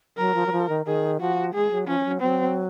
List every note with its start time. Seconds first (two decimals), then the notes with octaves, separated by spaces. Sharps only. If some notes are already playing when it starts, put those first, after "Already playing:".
0.18 F#3 A#4
0.35 F3
0.47 F#3
0.52 F3
0.69 D#3
0.86 D#3 G#4
1.20 F3 F#4
1.54 G#3 G#4
1.71 F#3
1.87 F3 C#4
2.00 F3
2.05 F#3
2.21 F#3 C4